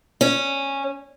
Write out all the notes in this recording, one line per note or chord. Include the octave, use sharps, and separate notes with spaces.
C#4